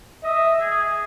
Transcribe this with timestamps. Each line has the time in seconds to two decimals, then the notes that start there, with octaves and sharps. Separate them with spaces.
0.24 D#5 E5
0.61 G#4